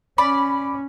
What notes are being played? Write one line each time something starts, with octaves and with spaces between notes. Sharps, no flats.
C#4 D5 B5